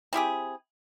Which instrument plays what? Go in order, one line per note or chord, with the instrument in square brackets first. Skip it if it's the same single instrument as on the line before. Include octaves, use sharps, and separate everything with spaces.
[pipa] C4 E4 G4 G#4